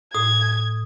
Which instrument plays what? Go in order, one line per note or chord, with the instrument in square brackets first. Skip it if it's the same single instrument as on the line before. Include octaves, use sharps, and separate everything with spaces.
[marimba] A2 [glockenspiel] D#6 [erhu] G#6